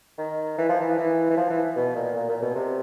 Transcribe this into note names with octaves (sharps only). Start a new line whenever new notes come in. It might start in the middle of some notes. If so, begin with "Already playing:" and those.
D#3
E3
F3
E3
E3
E3
F3
E3
B2
A#2
A#2
A#2
B2
C3